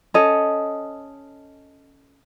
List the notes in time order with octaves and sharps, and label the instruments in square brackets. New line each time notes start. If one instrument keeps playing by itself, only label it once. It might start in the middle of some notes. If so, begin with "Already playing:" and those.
[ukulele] C#4 A4 D#5